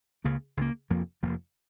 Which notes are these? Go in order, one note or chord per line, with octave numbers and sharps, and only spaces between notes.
C#2 C#3 A#3
C#2 C#3 A#3
F1 F2 F3 A#3
F1 F2 F3 A#3